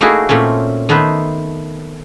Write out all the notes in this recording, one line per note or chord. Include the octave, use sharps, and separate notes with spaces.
A3 A#3 D#4 E4 F#4 G#4
A#2 A3 C4 C#4
D#3 A3 B3 B4 C5